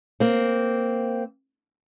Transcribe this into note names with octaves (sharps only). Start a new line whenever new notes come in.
A#3 C4